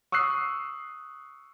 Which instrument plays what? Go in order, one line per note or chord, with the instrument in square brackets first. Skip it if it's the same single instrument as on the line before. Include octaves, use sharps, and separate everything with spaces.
[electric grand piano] C#6 D#6 E6 F#6 C7